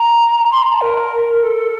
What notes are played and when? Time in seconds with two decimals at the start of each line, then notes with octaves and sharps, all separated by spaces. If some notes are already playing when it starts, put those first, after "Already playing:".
Already playing: A#5
0.52 C6
0.63 A#5
0.73 A5
0.82 A#4
1.43 A4